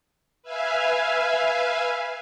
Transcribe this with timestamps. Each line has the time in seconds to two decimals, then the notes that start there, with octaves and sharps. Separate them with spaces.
0.43 B4 E5 F5 G#5